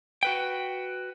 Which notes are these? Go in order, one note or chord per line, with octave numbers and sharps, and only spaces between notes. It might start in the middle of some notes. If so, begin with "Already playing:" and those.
F#4 B4 G5